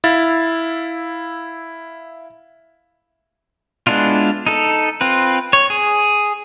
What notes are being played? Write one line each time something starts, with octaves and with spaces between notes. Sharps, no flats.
E4 F5 A6
G#3 B3 D4 E4 F4
D#4 A4
C4 F4 B4
C#5
G#4